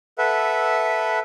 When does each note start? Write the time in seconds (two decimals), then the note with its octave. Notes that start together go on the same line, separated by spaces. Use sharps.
0.18 A4 B4 E5 F#5